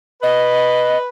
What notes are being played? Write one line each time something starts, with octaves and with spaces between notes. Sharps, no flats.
B4 D#5